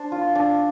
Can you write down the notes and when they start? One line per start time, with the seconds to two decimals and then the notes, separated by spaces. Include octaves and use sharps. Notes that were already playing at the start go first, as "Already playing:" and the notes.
Already playing: D4 C5
0.12 F4
0.35 D4